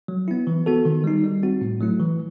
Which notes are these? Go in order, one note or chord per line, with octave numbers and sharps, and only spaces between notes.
F#3
B3 E4
E3
B3 F#4 A4
D#3
G3 D#4
G3
C4 F#4
A2
F#3 A3 E4
E3